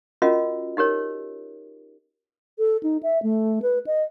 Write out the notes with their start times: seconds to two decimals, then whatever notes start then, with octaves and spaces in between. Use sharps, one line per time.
0.22 C#4 F4 F#4 A#4 D#5
0.77 D#4 G4 A#4 C#5
2.58 A4
2.83 D#4
3.03 E5
3.23 A3
3.62 B4
3.87 D#5